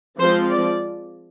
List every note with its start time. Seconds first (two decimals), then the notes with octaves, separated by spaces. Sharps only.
0.19 F3 G#3 C4 F4 C5
0.50 D5